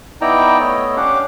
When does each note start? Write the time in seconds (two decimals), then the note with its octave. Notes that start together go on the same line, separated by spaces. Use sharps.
0.21 B3 D#4 E4 D5 G5 A#5
0.60 A3 B3 A4 C#5 D#5
0.96 C#4 D4 G4 F5 F#5 D6